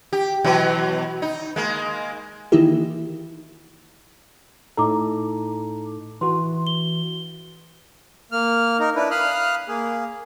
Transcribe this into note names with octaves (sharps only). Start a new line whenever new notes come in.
G4
B2 E3 F#3
D#4
G#3 A#3
D#3 E3 A#3 D#4 E4 G4
A2 D#4 A4 A#5 D6
E3 F#4 C6
G7
A#3 F6
D#4 A#4
D4 E4 B4
F5 B5 D#6 F6 F#6
A#3 G#4